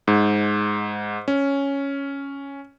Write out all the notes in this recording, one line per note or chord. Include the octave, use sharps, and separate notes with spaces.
G#2
C#4